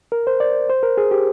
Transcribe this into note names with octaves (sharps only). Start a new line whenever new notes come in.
A#4
C5
D5
C5
A#4
G#4
G4